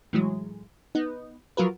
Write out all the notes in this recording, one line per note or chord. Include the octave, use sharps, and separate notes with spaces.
A2 E3 F#3 G#3
B3 D#4
F3 F#3 F4 F#4 A#4 B4